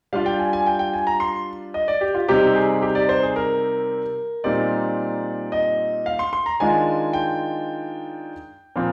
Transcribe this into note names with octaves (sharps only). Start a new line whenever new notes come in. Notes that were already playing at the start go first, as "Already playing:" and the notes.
G3 D4 F4 F5
G5
G#5
G#5
G5
G5
G#5
A#5
C6
D#5
D5
G4
F4
C3 G3 C4 D#4 G4
G#4
G4
D5
C5
G#4
A#4
A#2 G3 C4 D#4 D5
D#5
F5
C6
C6
A#5
D#3 G#3 D4 F4 G#5
G5
A#2 F3 C4